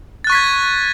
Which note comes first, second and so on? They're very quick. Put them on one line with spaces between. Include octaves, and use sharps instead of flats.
A6 F#6 C#6 B6 G#6